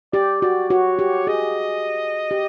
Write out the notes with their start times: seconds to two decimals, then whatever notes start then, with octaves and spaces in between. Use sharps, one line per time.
0.13 G4 D5
0.42 F#4 D5
0.70 F#4 C#5
0.99 G4
1.27 G#4 D#5
2.31 G4